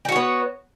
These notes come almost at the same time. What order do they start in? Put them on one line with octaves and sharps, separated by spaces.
G4 F#4 C#5 B3